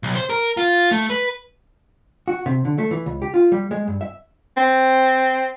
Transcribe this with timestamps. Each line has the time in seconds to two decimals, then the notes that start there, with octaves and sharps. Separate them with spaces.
0.03 B1
0.15 C5
0.30 A#4
0.57 F4
0.91 A3
1.10 B4
2.28 F#4
2.46 C3
2.65 D3
2.78 A3
2.91 E3
3.06 C#2
3.22 G4
3.34 F4
3.52 G3
3.71 G#3
3.88 G2
4.01 E5
4.57 C4